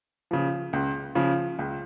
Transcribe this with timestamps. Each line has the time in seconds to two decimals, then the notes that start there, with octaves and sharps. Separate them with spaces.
0.31 C#3 F3
0.73 C#2
1.15 C#3 F3
1.59 C#2